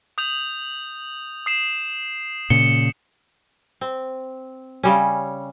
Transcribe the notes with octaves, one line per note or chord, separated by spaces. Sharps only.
D#6 G6 F7
D#6 C7 E7
A#2 C#3 C#7 G7
C4
C#3 G3 C#4